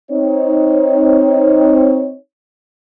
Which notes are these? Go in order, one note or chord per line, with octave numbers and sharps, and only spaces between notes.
C4 D#4 C#5